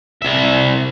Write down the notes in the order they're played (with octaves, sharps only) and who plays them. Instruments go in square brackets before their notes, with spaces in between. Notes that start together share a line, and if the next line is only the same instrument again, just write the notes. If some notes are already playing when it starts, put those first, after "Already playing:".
[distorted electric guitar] C2 E5